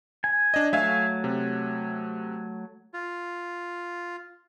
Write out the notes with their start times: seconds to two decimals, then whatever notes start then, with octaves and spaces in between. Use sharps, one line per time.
0.24 G#5
0.54 D4 D#5
0.73 F#3 A3 E5 F5 G#5
1.24 C3
2.94 F4